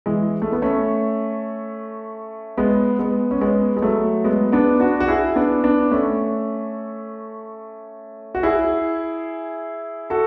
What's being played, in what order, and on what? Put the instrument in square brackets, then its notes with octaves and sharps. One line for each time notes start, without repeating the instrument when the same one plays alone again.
[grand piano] E3 G#3
A3
B3
A3 C#4
G#3 B3
G#3 B3
C#4
G#3 B3
G#3
F#3 A3
G#3 B3
B3 D4
D4 F#4
F#4
E4 G#4
B3 D4
B3 D4
A3 C#4
F#4
E4 G#4
F#4 A4